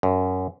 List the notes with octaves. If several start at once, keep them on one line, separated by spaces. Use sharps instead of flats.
F#2